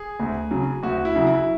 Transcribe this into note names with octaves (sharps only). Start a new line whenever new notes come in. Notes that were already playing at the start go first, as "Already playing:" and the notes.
Already playing: G#4
D2
C#3 F#3
D2 F#4
E4
C#3 F#3
E4